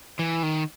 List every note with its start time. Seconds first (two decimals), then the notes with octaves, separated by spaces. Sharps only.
0.19 E3
0.43 D#3